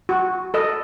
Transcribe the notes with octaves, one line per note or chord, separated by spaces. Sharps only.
F#4
A4 D#5